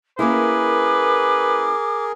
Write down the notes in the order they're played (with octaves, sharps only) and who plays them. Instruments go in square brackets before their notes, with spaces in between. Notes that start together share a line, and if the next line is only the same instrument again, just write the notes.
[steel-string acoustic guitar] A#3 C#4 E4 [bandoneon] G#4 A#4 [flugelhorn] B4 [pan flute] D6